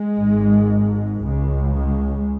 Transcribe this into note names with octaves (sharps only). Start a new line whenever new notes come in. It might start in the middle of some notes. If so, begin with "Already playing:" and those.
Already playing: G#3
G#1 G#2
C#2 C#3 G#3
G#3